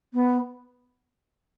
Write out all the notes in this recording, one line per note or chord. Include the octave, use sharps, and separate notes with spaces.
B3